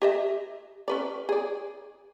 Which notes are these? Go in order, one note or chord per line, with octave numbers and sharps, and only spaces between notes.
G4 D#5 E5
C#4 B4 D5
G#4 D5